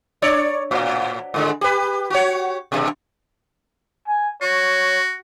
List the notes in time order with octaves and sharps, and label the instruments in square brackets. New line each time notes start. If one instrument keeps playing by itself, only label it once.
[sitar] D4 C#5 D5
A2
G#2 D3 G#3
G4 B4
F#4 G4 C#5
G2 B2
[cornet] G#5
[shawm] F#4 [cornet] C#5